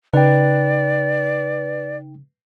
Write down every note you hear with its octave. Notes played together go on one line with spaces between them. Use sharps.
C#3 D#4 B4 D5 G5